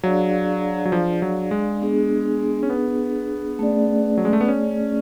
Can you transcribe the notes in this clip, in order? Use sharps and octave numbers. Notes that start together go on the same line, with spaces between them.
F#3 D4 G#4 D5 F5
F#3
F3
F#3
G#3
B3 D4 G#4
C#4
B3
A3 C#4 G#4 D5
F#3
G#3
A3
B3
C#4